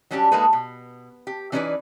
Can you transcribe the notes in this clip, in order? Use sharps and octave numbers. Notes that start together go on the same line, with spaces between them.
F#3 G3 C#4 D4 E4 G4
G#3 A#3 D#4 G#4 A4 B4
B2
G4
E3 C#4 D#4 A#4 B4 D5